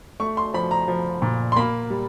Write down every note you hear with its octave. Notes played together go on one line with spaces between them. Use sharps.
A3 C#6
C6
F3 B5
A#5
F3
A#2
C6
A#3 B5
G3